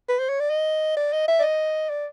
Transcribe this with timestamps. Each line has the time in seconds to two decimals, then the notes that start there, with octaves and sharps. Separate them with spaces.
0.09 B4
0.19 C5
0.29 C#5
0.40 D5
0.50 D#5
0.97 D5
1.13 D#5
1.28 E5
1.40 D5
1.43 D#5
1.90 D5